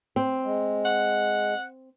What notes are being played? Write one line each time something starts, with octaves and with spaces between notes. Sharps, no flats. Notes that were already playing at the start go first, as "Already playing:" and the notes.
C4
G#3
F#5